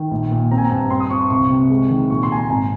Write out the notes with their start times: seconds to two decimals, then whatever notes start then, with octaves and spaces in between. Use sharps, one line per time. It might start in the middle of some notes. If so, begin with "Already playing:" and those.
Already playing: D#3
0.11 A#1
0.31 A#2
0.51 C4 A#5
0.58 G#5
0.65 A#5
0.71 G2
0.90 C4 C6
1.00 D#6
1.10 C4 C#6
1.20 C6
1.30 C2 C#6
1.50 C3
1.70 G#3
1.90 D#3
2.10 A#2 C#6
2.23 C6
2.30 A#2 G#5
2.37 A#5
2.50 G#1 G#5